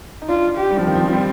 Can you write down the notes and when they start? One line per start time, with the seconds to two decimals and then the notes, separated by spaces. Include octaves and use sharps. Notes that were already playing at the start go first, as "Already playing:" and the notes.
0.22 D#4
0.29 D4 F4
0.57 G4
0.71 G3
0.79 F3
0.85 D#3 C4
0.95 F3
1.07 F3
1.13 G3